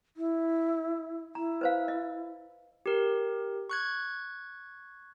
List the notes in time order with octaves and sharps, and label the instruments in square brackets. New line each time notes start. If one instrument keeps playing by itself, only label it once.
[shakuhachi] E4
[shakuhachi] E4 [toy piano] A#5
[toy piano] B4 C5 F5
D#5
[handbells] G4 A#4
C#6 F#6 G#6